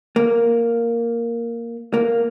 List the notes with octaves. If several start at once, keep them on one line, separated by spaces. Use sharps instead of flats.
A#3
A#3